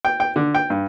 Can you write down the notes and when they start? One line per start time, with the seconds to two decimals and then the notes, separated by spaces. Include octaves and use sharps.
0.05 G5
0.20 G5
0.36 D3
0.55 G5
0.70 G2